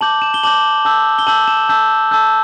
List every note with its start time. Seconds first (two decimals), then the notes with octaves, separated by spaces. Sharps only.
0.01 A5 D6 G6 F#7
0.22 E7
0.34 G7
0.43 A5 D6 G6 F#7
0.85 A5 E6 G6
1.19 G7
1.27 A5 E6 G6 F#7
1.48 E7
1.69 A5 E6 G6
2.11 A5 E6 G6